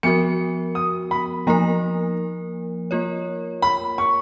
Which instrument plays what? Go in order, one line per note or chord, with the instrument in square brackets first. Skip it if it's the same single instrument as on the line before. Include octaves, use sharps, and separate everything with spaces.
[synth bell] F3 B3 F#4 A#4 [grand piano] C#7
[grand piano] D#6
B5
[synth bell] F3 A#3 D#4 A#4 [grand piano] A#5
[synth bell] A#3 F4 A#4 C#5
[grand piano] B5
C#6